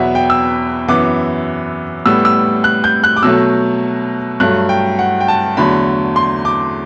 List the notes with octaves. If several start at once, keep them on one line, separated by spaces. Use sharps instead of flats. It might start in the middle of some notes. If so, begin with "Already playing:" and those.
Already playing: E2 B2 F#3 B3 E5 F#5
G5
E6
F#2 E3 B3 D6
A2 G3 B3 E6
E6
F#6
G6
F#6
D6
B2 F#3 A3 E6
G2 F#3 A3 F#6
G5
F#5
G5
A5
E2 D3 F#3 A3 B5
C6
D6